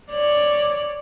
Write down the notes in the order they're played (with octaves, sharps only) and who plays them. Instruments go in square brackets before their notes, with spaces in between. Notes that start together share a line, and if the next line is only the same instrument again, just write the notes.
[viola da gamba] C#5 D5